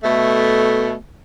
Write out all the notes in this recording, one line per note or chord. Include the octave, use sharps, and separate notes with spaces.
B2 A3